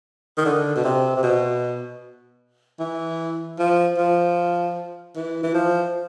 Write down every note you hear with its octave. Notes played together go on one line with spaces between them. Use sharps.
D#3
D3
B2
C3
C3
B2
E3
F3
F3
E3
E3
F3